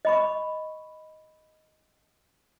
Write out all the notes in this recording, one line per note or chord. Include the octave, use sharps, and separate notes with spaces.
D#5 B5 C#6